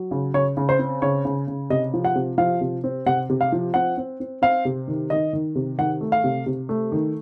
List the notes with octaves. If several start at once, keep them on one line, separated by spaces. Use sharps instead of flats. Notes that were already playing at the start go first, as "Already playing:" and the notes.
Already playing: F#3
C#3
C#3 C#5
C#3
C5
C4
C#3 C#5
C#3
C#3
C3 D#5
F3
F#5
C3
F3 F5
C3
C4
C3 F#5
C3
F5
F3
C4 F#5
C4
C4
C4 F5
C3
D#3
D#3 D#5
D#3
C3
D#3 F#5
A3
F5
C3
C3
A3
D#3